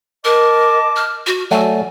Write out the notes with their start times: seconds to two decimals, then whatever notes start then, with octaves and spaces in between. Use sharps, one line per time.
0.25 A#4 D#5 A5 D6
0.96 F6
1.27 F#4
1.51 F#3 A3 D5 G#5